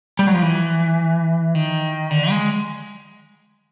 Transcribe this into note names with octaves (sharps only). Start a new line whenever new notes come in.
G3
F#3
F3
E3
D#3
D3
G#3